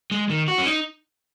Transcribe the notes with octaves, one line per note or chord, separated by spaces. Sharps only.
G#3
D#3
F#4
C#4
D#4